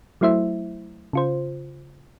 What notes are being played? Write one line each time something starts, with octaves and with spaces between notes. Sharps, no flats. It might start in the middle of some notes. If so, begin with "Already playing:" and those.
F#3 A3 E4 C5 E5
C#3 F4 C5